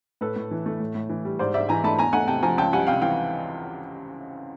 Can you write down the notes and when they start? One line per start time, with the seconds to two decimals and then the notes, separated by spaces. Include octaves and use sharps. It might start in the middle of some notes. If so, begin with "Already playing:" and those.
0.21 A2 A4 B4
0.36 A2
0.51 E3
0.66 A3
0.80 A2
0.95 A2
1.09 E3
1.25 G3
1.39 G#2 C5 D5
1.54 G#2 D5 E5
1.69 E3 G#5 A#5
1.84 A3 A5 B5
1.98 E2 G#5 A#5
2.13 A3 F#5 G#5
2.28 C3 G5 A5
2.43 F3 G#5 A#5
2.58 C#2 G5 A5
2.73 G3 F#5 G#5
2.87 C3 F5 G5
3.01 E3 F5 G5